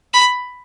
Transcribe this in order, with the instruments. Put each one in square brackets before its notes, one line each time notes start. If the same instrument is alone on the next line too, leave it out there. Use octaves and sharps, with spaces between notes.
[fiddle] B5